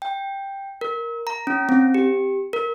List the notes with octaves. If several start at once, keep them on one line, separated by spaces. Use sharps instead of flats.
G5
A#4
A#5
C#4
C4
G4
A#4